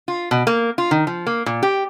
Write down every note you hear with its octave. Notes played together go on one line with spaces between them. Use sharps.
F4
B2
A#3
F4
D#3
F3
A#3
A#2
G4